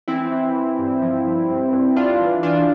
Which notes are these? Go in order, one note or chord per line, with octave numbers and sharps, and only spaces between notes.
E3 C4 E4
E3
E3
G2
F3
G2
G2
G2
G2 D4 F4
E3
E3 D4 F4